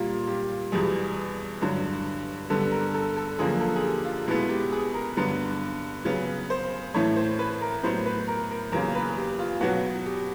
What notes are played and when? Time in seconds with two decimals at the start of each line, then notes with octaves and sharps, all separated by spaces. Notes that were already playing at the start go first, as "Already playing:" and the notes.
Already playing: A#2 G3 A#3 F4
0.27 G4
0.72 E2 B2 G3 G#4
1.61 G2 D3 F#3
2.50 G2 D3 G3 B3 A4
2.71 A#4
2.94 A4
3.17 A4
3.39 F#2 D3 F3 A#3 G#4
3.60 A4
3.76 G#4
3.83 G4
4.05 F4
4.28 B2 G#3 B3 E4
4.49 G4
4.72 G#4
4.94 A#4
5.17 G2 D3 F#3 B3
6.05 C#3 F#3 B3
6.50 C5
6.94 A2 E3 A3 C#5
7.16 C5
7.39 B4
7.61 A#4
7.83 A2 F#3 B3 C5
8.06 B4
8.28 A#4
8.50 A#4
8.72 E2 C#3 F#3 A#3 A#4
8.95 B4
9.17 G4
9.39 F4
9.61 B2 F#3 B3 F#4
10.06 G4